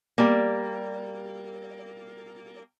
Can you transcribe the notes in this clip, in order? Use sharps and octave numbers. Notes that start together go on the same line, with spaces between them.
G3 A#3